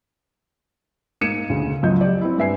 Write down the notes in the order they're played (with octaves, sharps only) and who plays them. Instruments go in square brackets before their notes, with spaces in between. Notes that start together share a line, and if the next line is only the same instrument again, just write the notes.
[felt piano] G#2 A#3 G#6 C#7 D#7 E7
D2 C#3
C#2 F#2 F3 F#3 D#5 G6
G4 D5
C4 E4
G2 B4 E5 G#5 C7